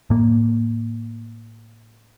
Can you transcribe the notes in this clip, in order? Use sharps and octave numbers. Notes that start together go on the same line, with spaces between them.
A2 A#3